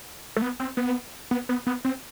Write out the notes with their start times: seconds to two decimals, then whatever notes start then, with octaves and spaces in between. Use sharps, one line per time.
0.36 A3
0.42 B3
0.60 C4
0.77 B3
1.31 B3
1.49 B3
1.67 B3
1.85 C4